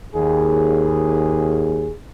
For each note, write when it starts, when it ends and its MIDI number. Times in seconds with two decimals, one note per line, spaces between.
0.15 1.93 39
0.15 1.93 68